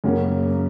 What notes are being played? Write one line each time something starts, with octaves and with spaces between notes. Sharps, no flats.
F#2 C#3 F#3 A#3 C#4